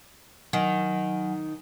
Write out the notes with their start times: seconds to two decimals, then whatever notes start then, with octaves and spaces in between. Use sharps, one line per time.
0.53 D#3 F#3 F#5 G#5